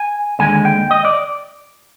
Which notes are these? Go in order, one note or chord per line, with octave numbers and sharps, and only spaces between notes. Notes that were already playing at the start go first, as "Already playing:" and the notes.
Already playing: G#5
D#2 D3 G#3 G#5
G5
D#5
D5